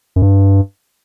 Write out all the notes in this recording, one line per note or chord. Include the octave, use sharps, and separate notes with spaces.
F#2
G2